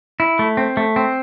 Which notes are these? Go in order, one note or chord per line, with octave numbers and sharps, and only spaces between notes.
E4
A3
C4
A3
C4